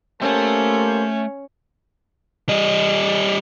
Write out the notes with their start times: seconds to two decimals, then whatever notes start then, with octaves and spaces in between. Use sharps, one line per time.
0.21 A3 A#3 C#4 G4 A4 C5 A5
2.49 G3 D#5